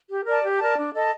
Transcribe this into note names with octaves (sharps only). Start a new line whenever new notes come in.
G4
A#4 D5 A5
G4
A#4 D5 A5
D4
A4 D#5 A5